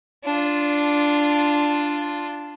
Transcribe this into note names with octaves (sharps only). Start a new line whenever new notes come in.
D4 F4